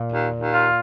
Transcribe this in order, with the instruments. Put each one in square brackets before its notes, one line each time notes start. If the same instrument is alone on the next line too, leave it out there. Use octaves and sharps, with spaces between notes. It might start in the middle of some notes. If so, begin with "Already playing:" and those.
Already playing: [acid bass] A#2
[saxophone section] D#2
D#2
F4